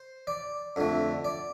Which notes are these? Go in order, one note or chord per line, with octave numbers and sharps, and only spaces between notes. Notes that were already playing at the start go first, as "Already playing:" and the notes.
Already playing: C5
D5
F2 D3 A3
D5